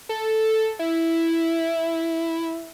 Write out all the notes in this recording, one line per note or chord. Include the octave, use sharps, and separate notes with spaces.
A4
E4